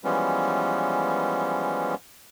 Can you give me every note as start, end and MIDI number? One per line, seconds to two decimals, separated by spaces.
0.04 1.95 52
0.04 1.95 53
0.04 1.95 55
0.04 1.95 56
0.04 1.95 59
0.04 1.95 61